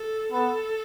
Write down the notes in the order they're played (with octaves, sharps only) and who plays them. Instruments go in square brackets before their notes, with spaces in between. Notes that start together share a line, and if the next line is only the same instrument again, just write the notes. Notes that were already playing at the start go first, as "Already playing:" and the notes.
Already playing: [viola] A4
[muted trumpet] B3 [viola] A4